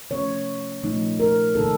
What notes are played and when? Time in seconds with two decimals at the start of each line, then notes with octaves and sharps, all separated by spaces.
0.10 C3 F3 A3 C#4 C#5
0.83 A#2 F3 A3 D#4
1.20 A#4
1.55 C3 D#3 A#3 D#4 A4